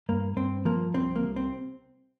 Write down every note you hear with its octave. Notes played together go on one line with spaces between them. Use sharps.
G2 A#3
G2 C4
F3 A#3
C2 C4
A#3
C2
C4